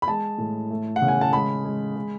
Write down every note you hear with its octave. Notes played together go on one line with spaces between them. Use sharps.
B5
G#3 A5
A2
A3
F#5
C#3
G#5
A5
G#3 B5
G#3
G#3